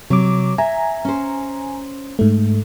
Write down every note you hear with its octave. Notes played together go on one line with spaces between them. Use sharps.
C3 F#3 D6
E5 G#5 A#5
C#4 C5
G#2 A3